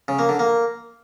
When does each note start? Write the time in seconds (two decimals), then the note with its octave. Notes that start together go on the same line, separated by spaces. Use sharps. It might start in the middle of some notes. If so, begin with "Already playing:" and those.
0.08 C#3
0.19 A#3
0.29 D3
0.39 A#3